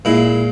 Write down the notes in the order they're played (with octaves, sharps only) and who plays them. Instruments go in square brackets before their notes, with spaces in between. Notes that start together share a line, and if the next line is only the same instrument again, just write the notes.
[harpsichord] A#2 G#3 E4